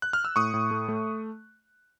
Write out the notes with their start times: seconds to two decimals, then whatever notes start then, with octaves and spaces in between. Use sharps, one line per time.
0.02 F#6
0.13 F6
0.25 E6
0.36 A2 C#6 D#6
0.54 A2
0.71 A3
0.89 A3